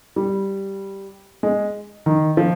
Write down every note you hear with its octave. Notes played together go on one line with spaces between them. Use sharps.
G3
G#3
D#3
F3